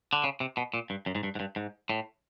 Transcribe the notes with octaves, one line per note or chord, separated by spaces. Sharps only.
D3
C#3
C3
B2
A#2
G2
F#2
G#2
G2
G#2
G2
G#2
A2